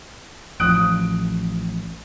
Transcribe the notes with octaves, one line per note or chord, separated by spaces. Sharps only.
A1 F3 D#6 F#6 D7